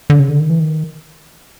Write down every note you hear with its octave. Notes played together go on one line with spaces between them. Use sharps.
D3
C#3
D3
D#3
E3
D#3